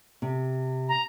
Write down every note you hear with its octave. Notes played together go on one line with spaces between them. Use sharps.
C3
A#5